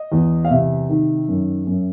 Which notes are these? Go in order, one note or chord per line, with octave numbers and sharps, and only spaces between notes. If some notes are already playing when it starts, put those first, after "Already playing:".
Already playing: D#5
E2
F5
C3 E5
D#3
F#2
F#2